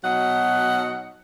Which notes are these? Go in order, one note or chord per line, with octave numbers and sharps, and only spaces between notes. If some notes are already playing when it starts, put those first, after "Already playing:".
B2 F#3 D#4 F#5